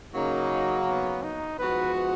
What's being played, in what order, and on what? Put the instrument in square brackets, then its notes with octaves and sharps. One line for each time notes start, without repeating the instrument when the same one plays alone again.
[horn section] C#3 F#3 A#3 [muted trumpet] D#4
[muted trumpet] B3
D#4
[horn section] G#2 F3 B3 F#4 [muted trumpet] B4